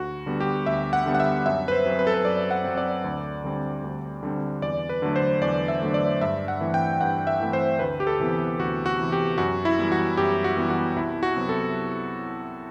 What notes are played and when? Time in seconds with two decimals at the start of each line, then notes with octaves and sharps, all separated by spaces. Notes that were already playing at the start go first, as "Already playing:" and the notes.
Already playing: D2 F#4
0.26 D3 G3 B3
0.40 G4
0.66 D2 E5
0.93 F#5
1.06 D3 G3 B3
1.15 F#5
1.20 E5
1.46 F#2 E5
1.68 B4
1.72 C5
1.86 F#3 C4
1.99 B4
2.07 A4
2.14 B4
2.25 F#2 D5
2.51 F#5
2.64 F#3 C4
2.77 D5
3.04 D2
3.44 D3 G3 C4
3.84 D2
4.23 D3 G3 C4
4.62 E2 D5
4.89 B4
5.02 D3 F#3 A3
5.16 C5
5.41 E2 D5
5.68 E5
5.82 D3 F#3 A3
5.94 D5
6.21 G2 E5
6.48 F#5
6.61 E3 A3 C4
6.74 G5
7.01 G2 F#5
7.27 E5
7.40 E3 A3 C4
7.53 C5
7.79 D2 B4
8.00 G4
8.07 A4
8.20 C3 E3 B3
8.59 D2 F#4
8.86 F#4
8.99 C3 E3 B3
9.12 G4
9.38 F#2 F#4
9.65 E4
9.78 E3 G3 B3
9.92 F#4
10.17 F#2 G4
10.44 F#4
10.57 E3 G3 B3
10.70 F#4
10.96 C2 E4
11.23 F#4
11.36 C3 F#3 B3
11.49 A4